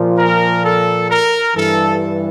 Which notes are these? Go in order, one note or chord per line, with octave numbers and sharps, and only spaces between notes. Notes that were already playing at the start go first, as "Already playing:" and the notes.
Already playing: A#2 F3
A#4
A4
A#4
G2 E3 A4